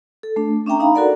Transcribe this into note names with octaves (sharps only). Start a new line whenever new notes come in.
A4
A3 D4
C#4 D4 E5 G5 A#5
D#4 F5 A#5 B5
F#4 A4 A#4 D5 F#5